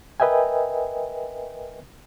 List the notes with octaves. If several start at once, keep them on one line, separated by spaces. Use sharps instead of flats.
A#4 B4 D#5 E5 G5 G#5